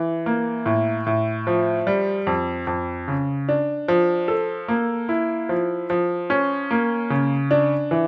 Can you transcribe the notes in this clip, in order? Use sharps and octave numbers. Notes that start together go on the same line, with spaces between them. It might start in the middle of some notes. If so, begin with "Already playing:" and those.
Already playing: E3
A#3
A2
A2
F3
G3
F2
F2
C#3
D4
F3
A4
A#3
E4
F3
F3
C#4
A#3
C#3
D4
E3